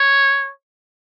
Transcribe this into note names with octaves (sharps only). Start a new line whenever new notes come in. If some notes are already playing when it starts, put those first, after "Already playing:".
Already playing: C#5